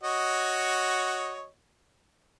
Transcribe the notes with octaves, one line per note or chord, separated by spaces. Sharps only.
F#4 C#5 D#5